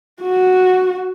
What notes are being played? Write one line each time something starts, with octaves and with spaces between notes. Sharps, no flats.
F#4